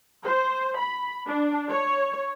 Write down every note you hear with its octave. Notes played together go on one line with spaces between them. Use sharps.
C5
B5
D4
C#5